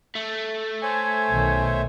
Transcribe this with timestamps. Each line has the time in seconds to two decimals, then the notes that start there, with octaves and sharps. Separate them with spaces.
0.15 A3
0.83 C5 C#5 E5 G#5
1.30 B1 D#3